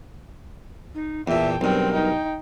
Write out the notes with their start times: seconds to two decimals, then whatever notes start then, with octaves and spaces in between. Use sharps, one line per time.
0.94 D#4
1.28 E2 A#2 E5 G5 A5
1.61 B1 G2 C4 A#4 G5
1.93 D#4 G5